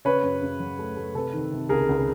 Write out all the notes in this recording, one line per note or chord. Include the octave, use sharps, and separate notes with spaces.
C#3 B4 C#5
F#2
C#3
F#3
A3
A3
C3 A4 B4
D#3
C3
C#2 G#4 A#4
C#2